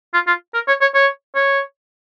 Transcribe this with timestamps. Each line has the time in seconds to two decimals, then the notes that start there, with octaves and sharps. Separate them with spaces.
0.14 F4
0.27 F4
0.54 A#4
0.68 C#5
0.81 C#5
0.94 C#5
1.35 C#5